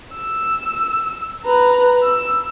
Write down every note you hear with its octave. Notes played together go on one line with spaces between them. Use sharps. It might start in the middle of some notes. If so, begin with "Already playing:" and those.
E6
B4 A#5
E6